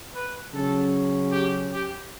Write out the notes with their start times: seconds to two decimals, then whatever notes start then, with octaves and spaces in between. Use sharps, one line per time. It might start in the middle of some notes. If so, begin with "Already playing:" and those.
0.14 B4
0.53 C#3 F#3 C#4 A4
1.30 G4
1.69 G4